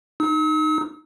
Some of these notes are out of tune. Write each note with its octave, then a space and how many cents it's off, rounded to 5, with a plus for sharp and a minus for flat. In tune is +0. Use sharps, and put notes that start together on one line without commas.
D#4 -15 E6 -45